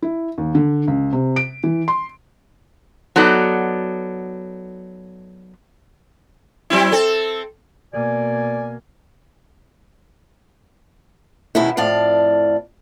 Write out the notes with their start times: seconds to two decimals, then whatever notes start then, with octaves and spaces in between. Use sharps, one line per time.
0.02 E4
0.38 D#2
0.55 D3
0.88 C#2
1.12 C3
1.36 D7
1.64 E3
1.88 C6
3.16 F#3 B3 D#4 A4 D5
6.70 F#3 C4 E4
6.92 C4 A4
7.93 B2 A#3 D5 G#5
11.55 B2 D#3 G#3 C#4 E4
11.77 F2 A2 D5 F5